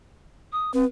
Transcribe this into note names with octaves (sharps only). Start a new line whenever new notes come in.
D#6
C4 B4